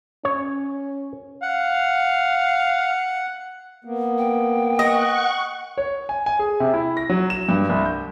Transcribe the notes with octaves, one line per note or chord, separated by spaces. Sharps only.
C#4 C#5
F5 F#5
A#3 B3
G5
D#5 F#5 C#6
C#5
G#5
G#5
G#4
C3
E4
A#6
F#3
E7
G2
C2
G6